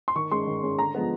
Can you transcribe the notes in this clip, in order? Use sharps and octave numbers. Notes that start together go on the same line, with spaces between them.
C6
D#3 C#6
G#3 C#4 C6
D#3
G#3 C#4
D3 A#5
F3 G#3 B3